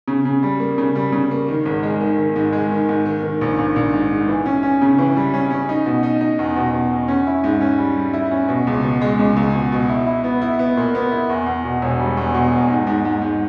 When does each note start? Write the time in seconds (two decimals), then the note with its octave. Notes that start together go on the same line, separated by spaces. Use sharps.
0.08 C#3
0.25 C#3
0.43 G3
0.60 A#3
0.78 C#3
0.95 G3
1.12 C#3
1.31 A#3
1.48 D#3
1.65 G#1
1.83 G#3
2.01 D#3
2.18 D#3
2.36 G#2
2.53 G#3
2.71 D#3
2.89 G#2
3.06 D#3
3.23 D#3
3.41 A#1
3.58 A#1
3.76 A#1
3.93 G#2
4.11 G#2
4.28 E3
4.46 C#4
4.63 C#4
4.82 C#3
4.98 E3
5.16 G3
5.34 C#4
5.50 C#4
5.69 D#4
5.86 B2
6.03 D#4
6.21 D#4
6.39 E2
6.56 B2
6.73 B2
6.91 E2
7.08 C#4
7.27 E4
7.44 G#2
7.61 C#4
7.79 G3
7.97 G3
8.13 E4
8.31 C#4
8.49 B2
8.67 C#2
8.84 B2
9.01 G#3
9.19 C#2
9.36 C#2
9.54 B2
9.72 B2
9.89 E4
10.07 E4
10.24 B3
10.41 E4
10.59 B3
10.77 A#2
10.95 B3
11.11 E4
11.29 E2
11.46 E2
11.64 B2
11.82 E1
12.00 G3
12.17 E2
12.34 B2
12.52 E2
12.70 G#2
12.87 G#2
13.05 G#2
13.22 G#2